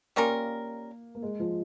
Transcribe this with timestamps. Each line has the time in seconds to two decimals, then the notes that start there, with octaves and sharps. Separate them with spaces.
0.16 G3 A#3 C#4 F4 A#4
1.15 A#3
1.22 G#3
1.40 F3